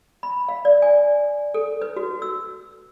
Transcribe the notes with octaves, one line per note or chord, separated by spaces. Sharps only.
B5
F5
D5
G#5
A4
B4
F#4
E6